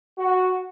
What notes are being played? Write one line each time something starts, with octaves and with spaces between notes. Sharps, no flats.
F#4